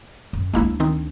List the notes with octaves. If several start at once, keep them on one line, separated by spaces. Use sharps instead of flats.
F#2
D2 G#3 A#3 D4 E4
D#3 C4 D#4